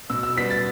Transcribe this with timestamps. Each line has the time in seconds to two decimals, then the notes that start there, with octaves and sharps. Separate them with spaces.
0.10 B2 E6
0.23 E6
0.36 G3 B3 B6
0.51 A6